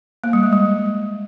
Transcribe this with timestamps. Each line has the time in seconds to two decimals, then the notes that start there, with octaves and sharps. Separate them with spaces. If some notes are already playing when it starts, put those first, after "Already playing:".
0.24 A#3
0.33 G3
0.43 G#3
0.53 G3